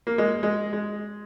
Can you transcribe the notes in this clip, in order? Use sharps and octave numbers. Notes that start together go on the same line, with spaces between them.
A#3
G#3
G#3
G#3